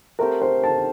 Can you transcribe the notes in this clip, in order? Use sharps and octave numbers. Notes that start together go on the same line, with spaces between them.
A3 C4 G4 A#4
C5
A5